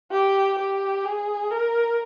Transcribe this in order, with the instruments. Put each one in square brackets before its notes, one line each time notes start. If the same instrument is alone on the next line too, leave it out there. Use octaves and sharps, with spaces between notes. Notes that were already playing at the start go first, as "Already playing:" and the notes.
[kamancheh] G4
G4
G#4
A#4